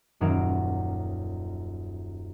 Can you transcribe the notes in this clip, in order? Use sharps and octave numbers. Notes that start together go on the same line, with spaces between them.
D#1 F#2 F#3 D#4 A#4 D7